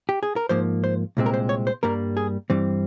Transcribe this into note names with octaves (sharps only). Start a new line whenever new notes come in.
G4
G#4
A#4
G#2 F3 A#3 C5
C5
C2 A#2 G#3 C4
A#4
C5
C#5
C5
G2 G3 A#3 A#4
G#4
G2 E3 G3 C4